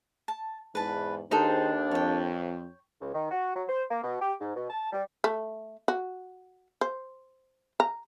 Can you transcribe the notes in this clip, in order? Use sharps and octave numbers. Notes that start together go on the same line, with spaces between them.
A5
E2 G#2 B4 A5
D#2 D#3 D4 D#4 G#4 A4 C5
F2 C#5 G5
C#2
D#3
F#4
F#3
C5
A#3
B2
G4
G#2
B2
A5
G3
A3
F#4
C5
A#5